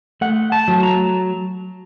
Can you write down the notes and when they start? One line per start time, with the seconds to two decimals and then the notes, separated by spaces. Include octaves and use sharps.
0.21 A3 F#5
0.52 A5
0.68 F#3
0.83 A#5